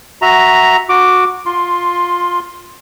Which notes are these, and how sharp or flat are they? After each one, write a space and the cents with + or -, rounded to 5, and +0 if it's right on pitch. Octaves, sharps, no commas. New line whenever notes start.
F#4 +0 E5 -5 A#5 +0
F#4 -15 D6 +0
F4 +10 C6 +0